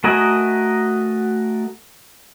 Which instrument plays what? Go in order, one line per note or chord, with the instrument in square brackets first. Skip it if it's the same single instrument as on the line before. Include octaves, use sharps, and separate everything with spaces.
[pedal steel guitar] A3 F#4 A#4 D#5 G#5